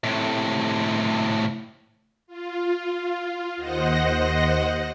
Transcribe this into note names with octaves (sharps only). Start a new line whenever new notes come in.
A2 C3
F4
D#2 C5 D#5 F#5 A#6